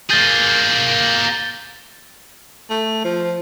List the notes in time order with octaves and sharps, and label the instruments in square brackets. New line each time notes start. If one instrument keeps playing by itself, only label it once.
[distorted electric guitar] A#3 G#4 [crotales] G6 A6 G7
[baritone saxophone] A3
F3